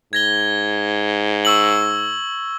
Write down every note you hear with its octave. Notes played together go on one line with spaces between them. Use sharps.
G#2 G#6 A#6 G7
C#6 E6 F#7